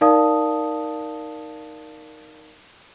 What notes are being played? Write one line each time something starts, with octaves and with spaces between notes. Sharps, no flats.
D#4 A#4 D5 F5 A5 D#6